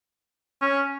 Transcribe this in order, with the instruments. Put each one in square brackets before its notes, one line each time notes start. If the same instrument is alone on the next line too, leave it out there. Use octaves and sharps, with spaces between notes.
[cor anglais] C#4